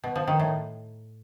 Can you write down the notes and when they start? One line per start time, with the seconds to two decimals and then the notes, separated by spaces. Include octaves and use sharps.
0.04 B2
0.16 F3
0.28 D#3
0.39 A2